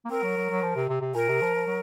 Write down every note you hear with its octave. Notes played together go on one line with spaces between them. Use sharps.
A#3
C4 A#4
F#3
F#3
F#3
F3
C3
C3
C3
A#2 A#4
C3
F3
F3
F#3